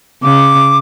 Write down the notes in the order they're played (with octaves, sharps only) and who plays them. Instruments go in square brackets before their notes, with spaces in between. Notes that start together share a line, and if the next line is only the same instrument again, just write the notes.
[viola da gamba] C#3 [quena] D6